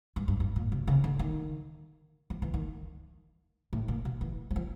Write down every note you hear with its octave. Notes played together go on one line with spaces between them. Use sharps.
G2
G2
G2
A#2
C3
C#3
D3
D#3
F3
E3
D#3
A2
A#2
B2
E3
F#3
F3